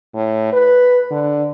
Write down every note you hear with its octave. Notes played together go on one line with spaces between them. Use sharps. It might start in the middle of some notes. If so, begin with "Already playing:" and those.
A2
B4
D3